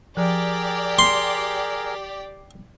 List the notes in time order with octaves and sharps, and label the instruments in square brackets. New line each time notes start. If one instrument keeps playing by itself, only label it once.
[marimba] F3 [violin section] G4 D5 [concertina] G#4 A#4
[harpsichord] C6